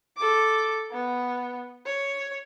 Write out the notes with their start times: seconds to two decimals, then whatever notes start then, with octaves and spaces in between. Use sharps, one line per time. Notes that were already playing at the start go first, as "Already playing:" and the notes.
0.17 A4 D6
0.91 B3
1.86 C#5